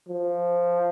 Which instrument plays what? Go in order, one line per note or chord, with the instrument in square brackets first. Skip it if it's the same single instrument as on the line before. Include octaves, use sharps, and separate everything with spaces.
[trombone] F3